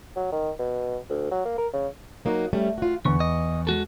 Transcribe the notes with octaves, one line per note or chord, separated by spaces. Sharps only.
F#3
D#3
B2
D2
F#3
A#3
A#4
C#3
F#3 A#3 D#4 F#4
G3 A3 C#4
F4 F#4
E2 D3 C#6
D#5
G#3 F#4 A4